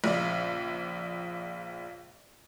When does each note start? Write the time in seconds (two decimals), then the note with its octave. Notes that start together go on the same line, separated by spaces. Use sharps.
0.04 A#1 C#3 D5